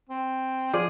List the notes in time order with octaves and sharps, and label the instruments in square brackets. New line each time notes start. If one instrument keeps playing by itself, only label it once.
[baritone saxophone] C4
[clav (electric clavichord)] F3 D5 [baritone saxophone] G#4